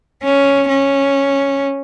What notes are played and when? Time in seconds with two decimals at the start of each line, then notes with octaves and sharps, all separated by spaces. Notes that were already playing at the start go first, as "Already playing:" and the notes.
0.24 C#4
0.69 C#4